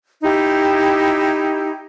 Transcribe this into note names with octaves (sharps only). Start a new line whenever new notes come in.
D#4 E4 G4